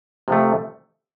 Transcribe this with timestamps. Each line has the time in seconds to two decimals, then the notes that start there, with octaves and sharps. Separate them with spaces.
0.28 C3 F3 A3